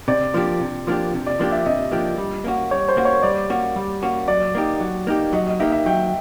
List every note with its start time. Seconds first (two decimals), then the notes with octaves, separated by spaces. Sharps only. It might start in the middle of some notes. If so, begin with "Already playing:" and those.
0.08 C3 D5
0.34 F3 A#3 D4 G4
0.61 C3
0.87 F3 A#3 D4 G4
1.13 C3
1.26 D5
1.39 F3 A#3 D4 G4
1.52 E5
1.65 C3 D#5
1.92 F3 A#3 D4 G4
2.18 G3
2.44 A#3 C#4 F#4
2.71 G3 C#5
2.89 C5
2.97 A#3 C#4 F#4
3.05 C#5
3.23 G3 D5
3.50 A#3 C#4 F#4
3.76 G3
4.02 A#3 C#4 F#4
4.28 F#3 D5
4.55 A#3 D#4 G4
4.80 F#3
5.07 A#3 D#4 G4
5.33 F#3 D#5
5.47 D#5
5.59 A#3 D#4 G4 E5
5.72 E5
5.86 F#3 G5